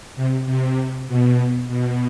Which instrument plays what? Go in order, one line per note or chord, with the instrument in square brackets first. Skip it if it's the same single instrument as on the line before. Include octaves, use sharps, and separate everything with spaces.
[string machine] C3
C3
B2
B2